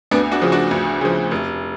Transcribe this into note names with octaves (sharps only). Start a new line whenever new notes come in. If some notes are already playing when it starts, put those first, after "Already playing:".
D2 B3 D4
D4 F#4
C#3 F3
D4 F#4
D2
C#3 F3
F1